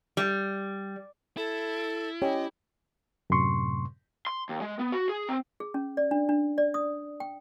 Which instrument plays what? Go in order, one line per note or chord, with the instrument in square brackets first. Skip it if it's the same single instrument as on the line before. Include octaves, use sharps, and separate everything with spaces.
[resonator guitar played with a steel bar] G3
[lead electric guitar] E4 [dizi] A4
[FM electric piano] C#4 [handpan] G4 [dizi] D#5
[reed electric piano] F#2 A2 C3 C6 C#6
[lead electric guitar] C6
D#2
G#3
B3
F#4
G#4
C4
[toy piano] G#4
C#4
D5
D4
D4
D5
D#6
G5